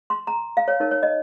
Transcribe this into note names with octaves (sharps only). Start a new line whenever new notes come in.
C6
A#5
F5
C#5
D#4 A#4 C#5
C#5
D#5